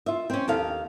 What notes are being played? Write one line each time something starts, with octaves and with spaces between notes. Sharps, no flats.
F4 E5
C4 C#4
D#2 A4 F5